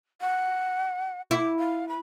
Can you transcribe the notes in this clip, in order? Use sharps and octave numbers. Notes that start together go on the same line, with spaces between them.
F#5
E4 D6
F5
B5